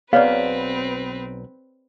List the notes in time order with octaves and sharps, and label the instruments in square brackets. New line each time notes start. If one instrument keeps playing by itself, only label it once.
[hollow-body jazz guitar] B1 B3 [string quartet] C4 B4 [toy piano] G#4 C#5 D5 [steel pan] F5